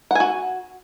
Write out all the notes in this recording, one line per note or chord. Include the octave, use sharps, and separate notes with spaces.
F#4 F#5 G#5